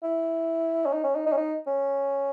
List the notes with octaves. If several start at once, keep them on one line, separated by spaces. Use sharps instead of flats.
E4
C#4
D#4
C#4
D#4
D#4
C#4
D#4
C#4